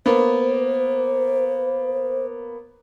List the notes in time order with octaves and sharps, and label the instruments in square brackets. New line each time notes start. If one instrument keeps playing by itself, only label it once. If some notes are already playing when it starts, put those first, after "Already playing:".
[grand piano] A#3 B3 [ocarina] C5